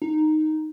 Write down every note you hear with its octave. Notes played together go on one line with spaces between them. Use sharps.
D#4